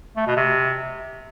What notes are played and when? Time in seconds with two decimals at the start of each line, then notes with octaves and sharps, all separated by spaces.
0.16 A3
0.26 B2
0.36 C3